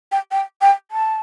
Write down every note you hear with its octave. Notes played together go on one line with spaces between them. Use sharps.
G5
G5
G5
A5